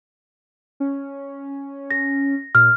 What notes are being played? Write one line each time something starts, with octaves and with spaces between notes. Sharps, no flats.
C#4
A#6
A#2 F6